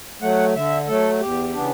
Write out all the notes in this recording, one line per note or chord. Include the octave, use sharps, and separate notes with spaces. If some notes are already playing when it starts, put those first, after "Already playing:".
F#3 A3 F#5
D3 E5
F#3 A3 A4
E2 G4
C#3 E3 B3 D4